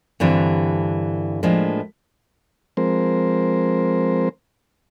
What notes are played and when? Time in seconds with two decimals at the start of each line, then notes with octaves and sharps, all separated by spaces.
0.20 G2 D3 E3 G3 C4
1.43 A2 F3 G#3 A#3 D4
2.77 F3 G#3 C4 A#4 C5